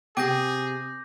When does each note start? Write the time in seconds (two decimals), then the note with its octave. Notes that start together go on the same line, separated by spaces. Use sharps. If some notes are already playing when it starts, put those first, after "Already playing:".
0.17 C3 G#4 G5 D6 G6 A#6